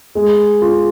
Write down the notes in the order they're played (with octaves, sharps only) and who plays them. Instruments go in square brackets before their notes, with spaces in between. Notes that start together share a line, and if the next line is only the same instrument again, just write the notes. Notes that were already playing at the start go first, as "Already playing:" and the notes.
[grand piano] G#3
F4